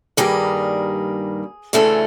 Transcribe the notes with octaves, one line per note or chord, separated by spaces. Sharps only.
G2 D#3 G3 A#3 G#4
D2 C#3 E3 A3 C#4